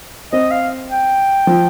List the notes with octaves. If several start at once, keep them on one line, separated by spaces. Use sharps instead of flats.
C4 D#5
F5
G5
F3